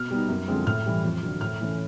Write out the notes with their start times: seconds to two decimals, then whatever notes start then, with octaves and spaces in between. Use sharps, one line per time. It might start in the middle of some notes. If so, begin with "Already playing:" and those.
Already playing: B2 F6
0.11 G3 B3 D#4
0.29 F#2
0.48 D3 F3 G#3 C4
0.66 A2 F6
0.86 E3 G3
1.04 F2
1.23 D3 F#3
1.41 A2 F6
1.61 E3 A3 C#4